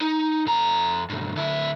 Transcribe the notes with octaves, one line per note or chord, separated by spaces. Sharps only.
D#4
F2 A#5
B1 G2
D2 E4